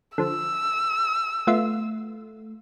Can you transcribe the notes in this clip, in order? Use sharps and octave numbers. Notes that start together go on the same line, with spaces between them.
D3 F3 E6
A3 B3 F4 E5